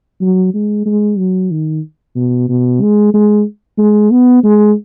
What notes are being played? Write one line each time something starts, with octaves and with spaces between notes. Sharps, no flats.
F#3
G#3
G#3
F#3
D#3
B2
B2
G#3
G#3
G#3
B3
G#3